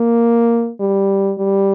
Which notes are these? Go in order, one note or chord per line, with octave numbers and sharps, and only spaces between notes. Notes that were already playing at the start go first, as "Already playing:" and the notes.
Already playing: A#3
G3
G3